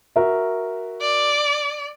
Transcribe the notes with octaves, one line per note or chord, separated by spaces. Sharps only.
F#4 A#4 E5
D5